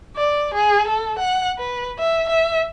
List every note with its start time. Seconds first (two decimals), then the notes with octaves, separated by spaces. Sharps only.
0.16 D5
0.54 G#4
0.88 A4
1.19 F#5
1.58 B4
1.99 E5
2.30 E5